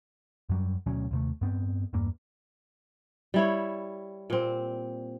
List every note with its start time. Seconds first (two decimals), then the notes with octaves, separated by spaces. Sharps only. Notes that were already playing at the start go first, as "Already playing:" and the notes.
0.49 F#2 F#3 G3
0.86 D2 B2 F#3 C#4
1.11 D#2 C3 A3
1.41 G2 B3 C4
1.93 E2 G2 A#3
3.34 G3 E4 C#5
4.30 A#2 C4